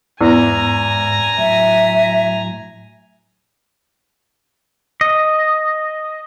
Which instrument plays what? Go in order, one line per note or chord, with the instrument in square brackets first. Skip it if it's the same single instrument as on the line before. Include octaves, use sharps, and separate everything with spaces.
[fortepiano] E2 [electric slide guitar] G#2 [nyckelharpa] G#5 A#5
[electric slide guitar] A2 F#3 [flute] E5
[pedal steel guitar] D#5